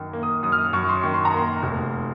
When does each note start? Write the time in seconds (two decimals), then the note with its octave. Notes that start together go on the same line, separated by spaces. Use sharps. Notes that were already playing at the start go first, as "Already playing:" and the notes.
Already playing: F#2 D#3
0.13 A#3
0.23 D#6
0.43 F#2 D#6
0.52 F6
0.58 D#6
0.73 F#2 C#6
0.89 C6
1.03 D#3 C#6
1.14 C6
1.25 A#5
1.34 A#3 C6
1.63 F1